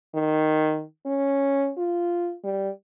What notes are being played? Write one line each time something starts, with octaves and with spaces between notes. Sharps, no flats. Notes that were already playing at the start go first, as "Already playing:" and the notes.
D#3
C#4
F4
G3